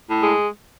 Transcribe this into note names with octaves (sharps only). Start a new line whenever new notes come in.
A2
G#3